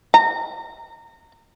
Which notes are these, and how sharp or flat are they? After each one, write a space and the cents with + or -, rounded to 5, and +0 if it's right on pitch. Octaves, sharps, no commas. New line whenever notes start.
A#5 -25